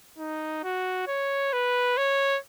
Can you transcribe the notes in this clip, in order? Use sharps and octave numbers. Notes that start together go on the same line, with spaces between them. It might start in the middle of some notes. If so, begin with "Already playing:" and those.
D#4
F#4
C#5
B4
C#5